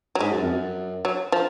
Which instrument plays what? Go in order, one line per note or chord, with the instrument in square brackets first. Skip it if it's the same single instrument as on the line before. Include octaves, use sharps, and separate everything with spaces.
[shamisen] F#3
[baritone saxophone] G#2 [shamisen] G#3
[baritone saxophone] F#2
F2
F#2
[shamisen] F#3
F3